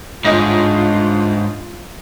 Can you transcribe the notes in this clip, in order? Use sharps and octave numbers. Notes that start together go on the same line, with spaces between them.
G1 G#2 D4 F4 D#5 A#6